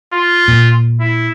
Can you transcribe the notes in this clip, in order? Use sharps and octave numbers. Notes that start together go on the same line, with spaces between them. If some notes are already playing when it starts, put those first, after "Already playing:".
F4
A#2
E4